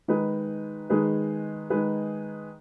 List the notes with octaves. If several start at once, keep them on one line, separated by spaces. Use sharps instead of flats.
D#3 G#3 D#4 G#4 B4
D#3 G#3 D#4 G#4 B4
D#3 G#3 D#4 G#4 B4